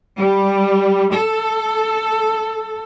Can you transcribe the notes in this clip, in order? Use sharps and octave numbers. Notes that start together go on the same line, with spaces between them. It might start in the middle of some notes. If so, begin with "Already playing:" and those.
G3
A4